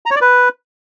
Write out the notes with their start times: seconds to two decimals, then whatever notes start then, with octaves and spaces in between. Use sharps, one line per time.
0.06 A#5
0.11 C#5
0.16 D5
0.21 B4